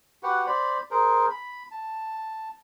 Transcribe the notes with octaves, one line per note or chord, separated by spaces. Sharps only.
F#4 G4 B4 F#5
C5 D5 B5
G#4 A#4 C5
B5
A5